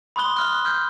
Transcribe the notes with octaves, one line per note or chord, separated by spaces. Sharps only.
B5 C6 D#6 F#6 G7
F6 F#6
F6 G6